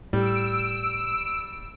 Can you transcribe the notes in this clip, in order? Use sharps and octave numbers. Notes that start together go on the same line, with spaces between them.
A2 G3 E6 D7